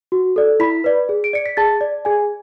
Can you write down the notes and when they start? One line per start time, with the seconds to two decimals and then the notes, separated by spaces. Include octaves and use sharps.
0.12 F#4
0.36 A4 D5
0.60 E4 B5 B6
0.84 B4 D5
1.09 G#4
1.24 D7
1.33 D5 C#7
1.46 B6
1.57 G#4 A5 A6
1.81 D5
2.05 G#4 G#5 G#6